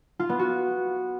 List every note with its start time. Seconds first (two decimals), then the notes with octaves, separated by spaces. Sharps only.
0.19 F4
0.29 B3
0.39 F#4